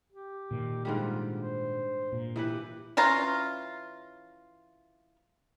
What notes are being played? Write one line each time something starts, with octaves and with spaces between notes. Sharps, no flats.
G4
A#2 D#3
G#2 D3 G3 F4
C5
A#2
E3 E4 G4 B4
E3 C#4 F4 A#5